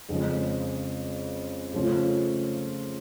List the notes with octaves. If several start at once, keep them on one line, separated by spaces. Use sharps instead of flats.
F2 C#3 F3 G#3
C#3 F3 A3 C#4 F4